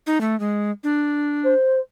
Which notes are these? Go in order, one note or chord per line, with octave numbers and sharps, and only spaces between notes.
D#4
A3
G#3
D4
C5